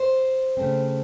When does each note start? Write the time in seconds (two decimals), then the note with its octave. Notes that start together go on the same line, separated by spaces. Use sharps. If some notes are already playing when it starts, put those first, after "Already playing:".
Already playing: C5
0.57 C#3 A3 C4